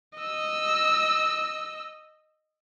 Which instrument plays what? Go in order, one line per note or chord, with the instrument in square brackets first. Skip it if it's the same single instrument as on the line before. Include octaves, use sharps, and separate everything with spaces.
[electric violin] D#5 E6